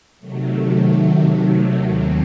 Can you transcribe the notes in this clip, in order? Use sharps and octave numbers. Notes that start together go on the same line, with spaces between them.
C3 D#3 F#3 A3
D#2 D#3 F#3 C4